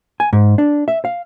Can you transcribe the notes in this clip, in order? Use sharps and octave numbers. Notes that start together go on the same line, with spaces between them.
G#5
G#2
D4
E5
F5